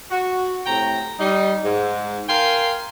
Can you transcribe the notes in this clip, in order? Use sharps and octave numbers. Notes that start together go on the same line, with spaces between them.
F#4
A2 C3 G5 A#5
G3 D#4
G#2
A#4 F5 G5 G#5 C6